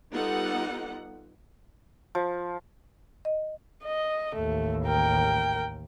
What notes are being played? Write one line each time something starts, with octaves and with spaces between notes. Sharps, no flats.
G3 B3 D#4 F4 A4 F#5
F3
D#5
D#5
A1 D#2 A3
A#4 G5